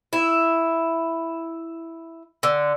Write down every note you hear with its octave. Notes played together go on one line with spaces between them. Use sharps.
E4
D3